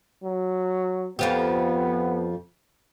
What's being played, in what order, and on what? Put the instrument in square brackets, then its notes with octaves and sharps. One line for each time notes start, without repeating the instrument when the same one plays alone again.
[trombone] F#3
[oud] F2 F3 G4 [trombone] B3